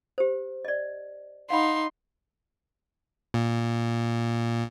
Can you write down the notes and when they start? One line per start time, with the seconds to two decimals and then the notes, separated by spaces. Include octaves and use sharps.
0.18 G4 C5
0.65 D5 D#5
1.50 D#4 F5 F#5 B5 C6
3.34 A#2